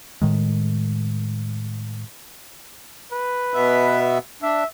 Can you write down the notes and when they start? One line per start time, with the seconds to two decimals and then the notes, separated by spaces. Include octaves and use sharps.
0.22 A2 D#3 G#3
3.12 B4
3.54 B2 B3 E5
4.42 D4 E5